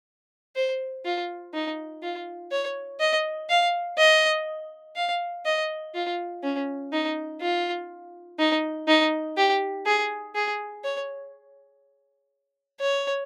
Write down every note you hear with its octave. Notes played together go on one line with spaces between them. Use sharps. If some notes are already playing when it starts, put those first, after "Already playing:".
C5
F4
D#4
F4
C#5
D#5
F5
D#5
F5
D#5
F4
C#4
D#4
F4
D#4
D#4
G4
G#4
G#4
C#5
C#5